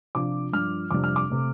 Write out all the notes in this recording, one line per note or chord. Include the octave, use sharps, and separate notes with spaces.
C3 F3 D4 F4 D6
G2 F3 D4 F4 F6
F2 C3 G3 D4 D6
F6
D6
C3 A3